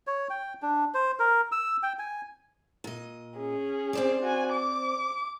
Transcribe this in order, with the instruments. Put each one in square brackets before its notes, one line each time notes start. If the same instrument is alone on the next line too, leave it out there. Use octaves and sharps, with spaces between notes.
[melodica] C#5
G5
D4
C5
A#4
E6
G5
G#5
[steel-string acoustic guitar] A#2 D#5
[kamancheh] C#4 G#4
[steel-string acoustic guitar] C4 C5 D5
[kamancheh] F#4 G#5
D6